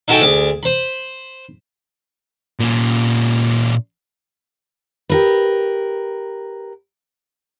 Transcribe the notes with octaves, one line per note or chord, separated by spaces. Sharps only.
D#4 E4 F#4 A4 G5 G#5
D2 G#4 D6
C5 B5
A#2 C#4
G4 A#4 B4